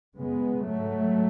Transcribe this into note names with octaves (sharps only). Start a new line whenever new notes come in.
F#2 C#3 G#3 B3
G#2 F#3 A3